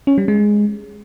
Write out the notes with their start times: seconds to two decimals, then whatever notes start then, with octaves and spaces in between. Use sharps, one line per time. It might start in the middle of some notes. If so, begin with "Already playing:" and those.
0.07 C#4
0.18 G3
0.28 G#3